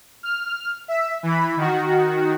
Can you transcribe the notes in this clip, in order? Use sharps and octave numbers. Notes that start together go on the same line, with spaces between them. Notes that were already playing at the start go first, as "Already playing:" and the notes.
F6
E5
E3 B5
D#3 F#4